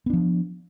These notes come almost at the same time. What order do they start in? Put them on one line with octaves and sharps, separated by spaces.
B3 D4 F3